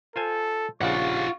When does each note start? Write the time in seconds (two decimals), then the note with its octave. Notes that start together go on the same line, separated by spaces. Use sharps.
0.16 F4 A4 C5 G#5
0.82 A#1 C#3 F4 D5 F#5 C#6